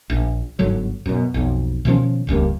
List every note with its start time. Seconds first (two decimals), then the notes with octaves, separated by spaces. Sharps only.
0.10 A#1
0.59 G1 G#2 D3 F#3
1.06 F#2 B2
1.34 B1 F2
1.85 B2 D#3 F3 C#4
2.27 D#1 C#2 G2 A#3